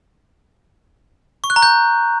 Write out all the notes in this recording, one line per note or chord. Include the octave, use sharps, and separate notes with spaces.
C#6
F#6
A#5
G6